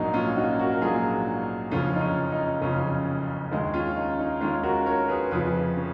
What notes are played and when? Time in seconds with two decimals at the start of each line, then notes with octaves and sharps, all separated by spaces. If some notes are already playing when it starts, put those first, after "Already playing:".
Already playing: A#1 G#2 F#3 A#3 D#4
0.14 C#4 F4
0.36 D#4 F#4
0.59 F#4 A#4
0.72 A#4
0.82 A#1 G#2 F#3 A#3 F4 G#4
1.71 F#1 F2 C#3 F3 C#4 F4
1.96 D#4
2.01 C#4 F4
2.32 D#4
2.61 F#1 F2 C#3 F3 C#4
3.51 D#2 D#3 G#3
3.74 C#4 F4
3.97 D#4
4.19 D#4
4.41 D#2 D#3 G#3 C#4 F4
4.63 F#4 A#4
4.86 A#4 C#5
5.08 G#4 B4
5.31 F1 F2 C#3 F3 G#4 B4
5.77 C#4